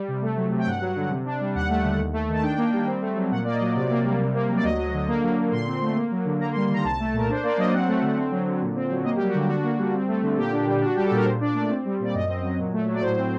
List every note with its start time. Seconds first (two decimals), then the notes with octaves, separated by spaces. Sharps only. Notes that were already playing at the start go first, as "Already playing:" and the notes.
Already playing: G3
0.08 C3
0.22 A3
0.37 F#3
0.51 C3
0.59 G5
0.66 G2 F#5
0.81 F#3
0.96 D3
1.10 C3
1.25 D4
1.40 G3
1.55 D#2 F#5
1.69 A3
1.84 D3
1.99 D#2
2.13 A3
2.28 D#3 A5
2.42 D4 G5
2.58 A#3
2.73 G3
2.87 C4
3.01 A3
3.16 F#3
3.31 A#2 F#5
3.44 A#3 D5
3.53 D#5
3.60 F#3
3.75 C3 D5
3.90 A#3
4.05 G3
4.20 C3
4.34 A#3
4.49 F#3
4.56 D5
4.64 D2 D#5
4.78 F#3
4.93 D3
5.08 A#3
5.23 F#3
5.38 D3
5.52 A#2 C6
5.66 C4
5.81 A3
5.96 A#3
6.11 F#3
6.25 D3
6.40 A#3 A#5
6.51 C6
6.56 G3
6.69 D#3 A#5
6.84 C2 A5
6.99 A3
7.14 A#2 A#4
7.29 D4 C5
7.43 A#3 D5
7.58 F#3 D#5
7.72 C4 F#5
7.87 A3
8.02 D3
8.17 C4
8.31 F#3
8.46 D3
8.62 A#2
8.76 C4
8.90 F#3
9.05 A#3 D#5
9.16 G4
9.20 G3
9.28 F#4
9.34 D3 G4
9.49 D4 F#4
9.64 A#3
9.78 G3
9.94 C4
10.08 A3
10.22 D3
10.37 A#2 G4
10.53 D4
10.67 G3
10.81 D4 F#4
10.95 G3 G4
11.05 A4
11.11 A#2 A#4
11.25 A#2 C5
11.40 D4 D5
11.55 A3 D5
11.70 C4
11.85 G3
12.00 A#2 D5
12.14 F#2 D#5
12.29 C4
12.43 F#3
12.58 A#2
12.73 A3
12.88 F#3
12.94 D5
13.02 A2 C5
13.17 C4